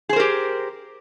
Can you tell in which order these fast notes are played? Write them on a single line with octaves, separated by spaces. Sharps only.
G#4 C5 A#4 G4